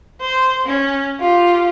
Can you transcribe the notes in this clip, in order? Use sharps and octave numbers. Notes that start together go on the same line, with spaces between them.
C5
C#4
F4 G4